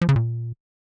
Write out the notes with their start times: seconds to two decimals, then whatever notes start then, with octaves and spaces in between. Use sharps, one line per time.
0.02 F3
0.09 C#3
0.16 A#2